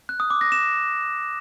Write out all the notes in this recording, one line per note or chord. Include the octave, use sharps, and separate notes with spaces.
F#6
D#6
D6
A#6
E7